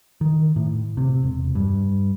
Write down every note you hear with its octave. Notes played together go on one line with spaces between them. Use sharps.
D#3
A2
C3
E1
G2